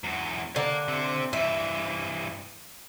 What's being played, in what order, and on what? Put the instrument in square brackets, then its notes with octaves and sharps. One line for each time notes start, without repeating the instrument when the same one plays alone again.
[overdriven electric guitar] E2 F#3
[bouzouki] D3 [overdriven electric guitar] F5 A#5
[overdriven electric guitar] C3 C4
[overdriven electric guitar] G2 E3 [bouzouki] E5